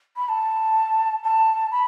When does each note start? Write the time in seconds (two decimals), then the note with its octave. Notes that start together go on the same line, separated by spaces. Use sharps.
0.16 B5
0.28 A5
1.24 A5
1.71 B5